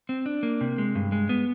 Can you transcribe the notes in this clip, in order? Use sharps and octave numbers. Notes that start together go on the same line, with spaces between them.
C4
D4
A#3
C3
G#3
G2
G#3
B3